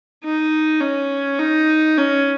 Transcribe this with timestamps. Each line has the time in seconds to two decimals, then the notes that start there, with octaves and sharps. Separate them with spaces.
0.24 D#4
0.81 C#4
1.39 D#4
1.98 C#4